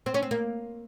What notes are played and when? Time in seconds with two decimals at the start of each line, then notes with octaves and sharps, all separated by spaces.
0.06 C4
0.14 C#4
0.23 C4
0.31 A#3